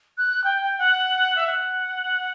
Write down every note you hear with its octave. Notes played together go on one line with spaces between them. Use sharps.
F#6
G5
G5
F#5
E5
F#5